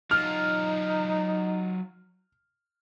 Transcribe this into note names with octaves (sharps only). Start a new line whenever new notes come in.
F#3 D#4 F4 F6